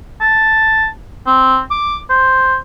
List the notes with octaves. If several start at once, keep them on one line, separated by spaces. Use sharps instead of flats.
A5
C4
D6
C5